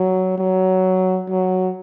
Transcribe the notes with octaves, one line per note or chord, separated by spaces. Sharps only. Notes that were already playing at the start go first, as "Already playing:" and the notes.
Already playing: F#3
F#3
F#3